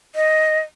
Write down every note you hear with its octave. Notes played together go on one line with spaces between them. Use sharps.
D#5